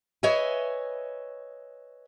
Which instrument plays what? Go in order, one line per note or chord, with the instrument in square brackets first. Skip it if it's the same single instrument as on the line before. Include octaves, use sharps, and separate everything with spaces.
[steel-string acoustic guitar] B4 C#5 D#5 E5 G#5